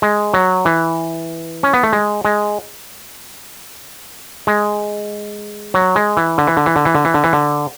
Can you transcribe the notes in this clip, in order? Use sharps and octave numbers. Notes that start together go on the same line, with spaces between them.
G#3
F#3
E3
C#4
B3
A3
G#3
G#3
G#3
F#3
G#3
E3
D3
E3
D3
E3
D3
E3
D3
E3
D3
E3
D3